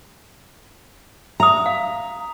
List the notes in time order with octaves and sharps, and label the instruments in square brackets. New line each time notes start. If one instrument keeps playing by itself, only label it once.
[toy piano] E5 D#6 [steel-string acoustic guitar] A#5
[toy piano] F5